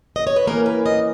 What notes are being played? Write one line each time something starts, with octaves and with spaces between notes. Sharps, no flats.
D#5
C#5
B4
E3 A#3 C#4 A#4
B4
D#5